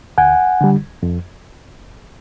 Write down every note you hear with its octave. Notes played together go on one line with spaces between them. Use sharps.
D2 F#5 G#5
D3 G3
F2